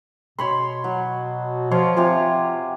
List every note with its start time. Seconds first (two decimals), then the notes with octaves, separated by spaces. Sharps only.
0.39 B2 C#5 B5 C6
0.84 F#3
1.71 F3 C#5 F5 C6
1.97 C3 F4 G4 G#5